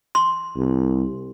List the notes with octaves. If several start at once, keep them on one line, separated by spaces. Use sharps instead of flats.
C6
C2